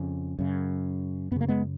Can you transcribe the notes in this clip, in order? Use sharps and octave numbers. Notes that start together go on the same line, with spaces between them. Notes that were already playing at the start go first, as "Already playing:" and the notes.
Already playing: F2 C#3
F#2 C#3
F#2 C#3 A#3 B3
G#3 B3